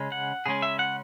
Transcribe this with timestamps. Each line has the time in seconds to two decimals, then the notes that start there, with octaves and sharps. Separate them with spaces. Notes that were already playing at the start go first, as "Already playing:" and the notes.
Already playing: C#3 G#3 C#4
0.12 F#5
0.46 C#3 G#3 C#4 G#4
0.62 E5
0.79 F#5